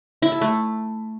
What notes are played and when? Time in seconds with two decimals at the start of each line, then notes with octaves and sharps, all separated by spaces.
0.22 E4
0.32 A4
0.41 A3